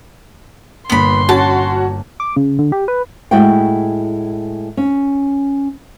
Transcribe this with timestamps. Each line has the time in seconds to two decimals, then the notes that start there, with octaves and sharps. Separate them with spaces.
0.90 G1 A#2 A#3 B3 B5 C6
1.29 C#4 F#4 A5
2.20 D6
2.36 C#3
2.59 D3
2.72 G4
2.88 B4
3.31 A2 G#3 E4 F#4 F#5 G5
4.77 C#4